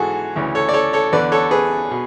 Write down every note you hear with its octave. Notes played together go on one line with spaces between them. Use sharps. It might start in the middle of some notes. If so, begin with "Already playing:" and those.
Already playing: G#2 E3 F#4 G#4 A4
D2 C#3 E3
A4 C#5
D5
A4 C#5
A4 C#5
E2 D3 B4 D5
A4 C#5
G#4 B4
B2